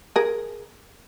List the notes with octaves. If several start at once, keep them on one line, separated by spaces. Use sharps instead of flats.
G#4 A#4